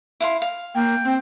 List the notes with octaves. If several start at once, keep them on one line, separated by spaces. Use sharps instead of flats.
E4 F5 C6
F5
A#3 G5
C4